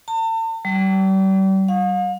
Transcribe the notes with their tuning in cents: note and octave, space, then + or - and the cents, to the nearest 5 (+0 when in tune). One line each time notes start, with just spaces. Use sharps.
A5 +40
G3 -35
F5 +40